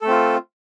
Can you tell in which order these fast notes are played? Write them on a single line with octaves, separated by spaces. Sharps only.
A4 A3 C4 F4